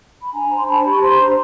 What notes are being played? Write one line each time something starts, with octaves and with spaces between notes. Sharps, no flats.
B5
D4 G#5 A#5
C5
C6
D4 A5 B5
G4
C#6
C5 A#5 C6
D4